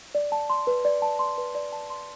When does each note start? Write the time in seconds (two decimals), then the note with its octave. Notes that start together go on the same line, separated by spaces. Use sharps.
0.15 D5
0.32 A5
0.50 C6
0.67 B4
0.85 D5
1.02 A5
1.19 C6
1.38 B4
1.55 D5
1.72 A5
1.90 C6